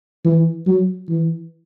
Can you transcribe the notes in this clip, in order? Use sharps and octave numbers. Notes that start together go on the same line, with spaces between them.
E3
F#3
E3